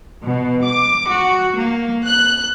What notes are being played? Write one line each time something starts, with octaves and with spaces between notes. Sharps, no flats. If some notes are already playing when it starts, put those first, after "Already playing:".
B2
D6
F#4
A#3
F#6